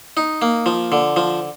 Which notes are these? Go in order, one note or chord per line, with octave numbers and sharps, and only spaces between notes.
D#4
A#3
F3
D3
F3